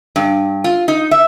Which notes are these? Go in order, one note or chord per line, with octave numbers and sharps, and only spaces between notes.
G2
F4
D#4
E5